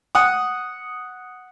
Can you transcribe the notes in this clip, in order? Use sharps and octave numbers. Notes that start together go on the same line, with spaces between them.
F#5 D#6